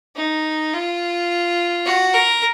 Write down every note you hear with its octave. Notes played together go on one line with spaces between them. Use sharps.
D#4
F4
F#4
A#4